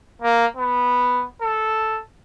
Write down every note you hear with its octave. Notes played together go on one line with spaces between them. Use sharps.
A#3
B3
A4